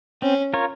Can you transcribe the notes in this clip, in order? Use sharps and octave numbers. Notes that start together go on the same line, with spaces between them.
C4 C#4
F4 A#4 C#5